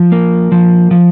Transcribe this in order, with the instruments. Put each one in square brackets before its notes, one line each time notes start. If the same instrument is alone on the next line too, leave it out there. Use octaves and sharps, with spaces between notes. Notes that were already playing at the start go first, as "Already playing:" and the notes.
Already playing: [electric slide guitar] F3
A#3
F3
F3